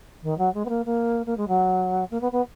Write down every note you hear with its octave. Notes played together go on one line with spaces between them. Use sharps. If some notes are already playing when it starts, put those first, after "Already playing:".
D#3
F#3
G#3
B3
A#3
A#3
A#3
G#3
F#3
A#3
B3
B3